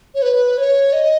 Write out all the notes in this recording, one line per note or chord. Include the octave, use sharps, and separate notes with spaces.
C#5
B4
C#5
D#5